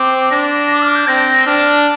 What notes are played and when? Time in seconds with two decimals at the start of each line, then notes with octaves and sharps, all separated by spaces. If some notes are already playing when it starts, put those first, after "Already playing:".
Already playing: C4 D6
0.31 D4 A#6
0.71 D6
0.82 F6
0.95 G6
1.07 C4 A#6
1.46 D4 F6